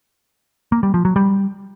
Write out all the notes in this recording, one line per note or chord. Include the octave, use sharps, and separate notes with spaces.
A#3
G3
F3
F#3
G3